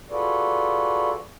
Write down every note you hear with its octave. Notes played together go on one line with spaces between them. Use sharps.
F4 F#4 G#4 A4 B4 D5